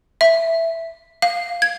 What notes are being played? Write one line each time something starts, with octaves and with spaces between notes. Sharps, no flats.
E5
F5
G#6